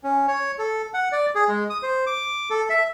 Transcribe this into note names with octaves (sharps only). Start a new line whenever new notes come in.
C#4
C#5
A4
F#5
D5
G#4
G#3
D#6
C5
D6
A4
E5